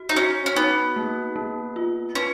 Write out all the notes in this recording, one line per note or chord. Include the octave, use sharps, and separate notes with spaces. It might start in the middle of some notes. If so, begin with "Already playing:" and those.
Already playing: F#4
D#4
C#4 F#4
C#4
B3 D#4
A#3
A#3
F4
C#4 B4